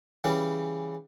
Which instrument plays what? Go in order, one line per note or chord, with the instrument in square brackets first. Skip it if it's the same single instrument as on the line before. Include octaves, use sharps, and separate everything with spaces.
[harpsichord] C#3 E3 G3 C#4